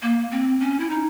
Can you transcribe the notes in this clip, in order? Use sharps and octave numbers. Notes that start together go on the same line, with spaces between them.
A#3
C4
C#4
E4
D#4